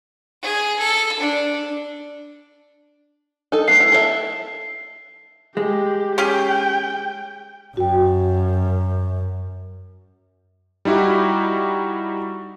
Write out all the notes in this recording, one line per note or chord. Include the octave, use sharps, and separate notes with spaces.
G#4
A4
D4
D#4 A4
A3 B3 C7
E4
A4 A#4 E5
G#3 G4
C#4 G4 G#4 G5
F#2 F#4 G5
G3 D#4 E4 F#4 G4